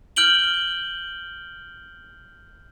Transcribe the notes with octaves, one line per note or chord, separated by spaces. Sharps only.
F6 G6 D7 F#7 G7